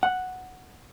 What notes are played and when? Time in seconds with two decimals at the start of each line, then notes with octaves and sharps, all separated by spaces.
0.03 F#5